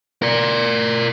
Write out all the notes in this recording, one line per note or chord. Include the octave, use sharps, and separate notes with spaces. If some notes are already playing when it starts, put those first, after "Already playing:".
A#4 D5